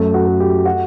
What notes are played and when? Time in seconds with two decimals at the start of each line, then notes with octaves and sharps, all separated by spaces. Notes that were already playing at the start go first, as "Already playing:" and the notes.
Already playing: F#2 A3
0.14 F#4
0.28 A3
0.40 G4
0.66 F#4